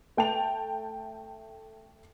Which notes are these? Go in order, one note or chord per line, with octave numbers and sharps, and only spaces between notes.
A3 G5 A5 F7